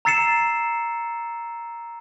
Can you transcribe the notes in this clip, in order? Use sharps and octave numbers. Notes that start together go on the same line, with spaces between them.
A#5 E6 A6 C7 C#7 E7